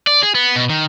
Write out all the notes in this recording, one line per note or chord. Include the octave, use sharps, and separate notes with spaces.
D5
G#4
B3
B2
D#3